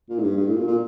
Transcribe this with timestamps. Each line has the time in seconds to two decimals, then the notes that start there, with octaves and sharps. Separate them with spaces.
0.10 A#2
0.19 A2
0.23 G2
0.37 G2
0.47 A2
0.57 A#2
0.67 A#2